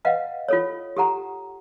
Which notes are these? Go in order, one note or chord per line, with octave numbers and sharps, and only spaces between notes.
B4 D#5 F5 F#5
F4 A4 C#5
G4 A4 F#5 A#5